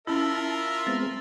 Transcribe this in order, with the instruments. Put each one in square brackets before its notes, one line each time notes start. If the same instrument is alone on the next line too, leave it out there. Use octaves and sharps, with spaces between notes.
[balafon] C#4 E4 [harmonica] F4 A#4 E5 [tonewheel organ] A5 [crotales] E6
[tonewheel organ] G#3 B3 C4 [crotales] A6